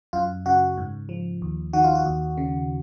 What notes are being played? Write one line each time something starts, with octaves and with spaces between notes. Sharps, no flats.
F#2 F4
C#3 F#4
G#2
F3
D#2
D#3 F#4
F4
F#4
D#2
C#3